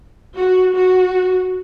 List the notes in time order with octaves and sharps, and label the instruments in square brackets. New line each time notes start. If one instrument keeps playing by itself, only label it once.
[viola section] F#4
F#4